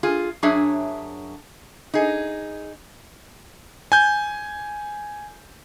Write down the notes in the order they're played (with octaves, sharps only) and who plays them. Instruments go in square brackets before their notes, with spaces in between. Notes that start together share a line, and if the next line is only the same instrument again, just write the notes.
[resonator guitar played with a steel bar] F4 G#4
F#2 F#3 D4 G#4 C#5 E5
D#4 G#4
[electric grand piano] G#5 G6